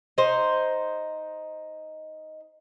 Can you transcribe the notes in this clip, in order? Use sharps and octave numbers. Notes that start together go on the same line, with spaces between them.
D#4 C5